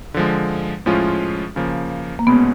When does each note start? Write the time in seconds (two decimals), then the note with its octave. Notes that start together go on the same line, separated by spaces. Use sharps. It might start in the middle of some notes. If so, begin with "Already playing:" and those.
0.14 D3 F3 G#3
0.86 A2 F3 G#3 C#4 F4
1.56 C#3 F3 A#3
2.19 A#3
2.27 C2 B2 G#3 B3 C#4